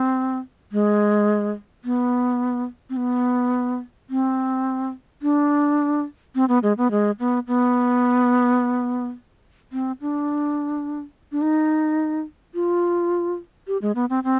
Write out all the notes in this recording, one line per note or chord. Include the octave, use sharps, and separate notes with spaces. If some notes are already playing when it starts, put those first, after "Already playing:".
Already playing: C4
G#3
B3
C4
B3
C4
D4
C4
B3
G#3
B3
G#3
B3
B3
C4
D4
D4
D#4
F4
G4
G#3
B3
C4
C4